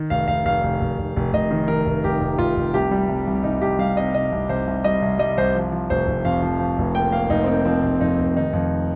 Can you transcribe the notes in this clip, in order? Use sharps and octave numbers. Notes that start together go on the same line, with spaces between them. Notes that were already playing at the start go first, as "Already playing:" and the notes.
Already playing: D#3
F1 F5
F1 F5
F1 F5
F1
F1
F1
F1
F1 D#5
D#3
D#3 A#4
F1
F1 G4
F1
F1 F4
F1
C2 G4
G3
C2
C2
C2 D#4
C2 G4
G3 F5
C3 D#5
C3 D#5
C2
C2 C5
C2
G3 D#5
C2
G3 D#5
C2 C5
F3
F3
F1 C5
F1
F2 F5
F3
F3
F1
A#3 G5
A#3 F5
F1 D#4
C4
A#3 D#4
F3 C4
F1
F2 D#4
F1
D#3 D#4
F2